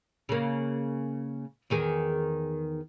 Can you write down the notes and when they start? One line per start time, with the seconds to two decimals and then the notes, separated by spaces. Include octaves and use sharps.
0.29 C#3 A#3
1.70 E2 D#3 G#4